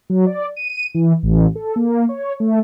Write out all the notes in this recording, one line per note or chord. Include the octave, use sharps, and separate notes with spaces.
F#3
D5
D#7
E3
A1
A4
A#3
C#5
A3